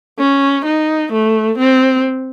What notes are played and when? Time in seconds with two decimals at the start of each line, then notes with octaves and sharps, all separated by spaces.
0.19 C#4
0.65 D#4
1.13 A3
1.58 C4